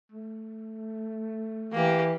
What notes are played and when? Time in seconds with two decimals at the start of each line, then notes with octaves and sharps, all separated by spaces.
0.12 A3
1.73 E3 A#3 G4